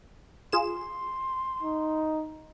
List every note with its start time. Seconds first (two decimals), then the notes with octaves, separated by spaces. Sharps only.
0.52 F4 G#4 C6 E7
1.62 D#4